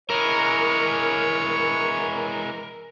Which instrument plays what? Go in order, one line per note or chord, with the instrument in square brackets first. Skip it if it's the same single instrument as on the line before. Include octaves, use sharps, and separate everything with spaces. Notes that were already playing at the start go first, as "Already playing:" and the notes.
[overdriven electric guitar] E3 G#3 [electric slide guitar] A#4 [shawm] C#5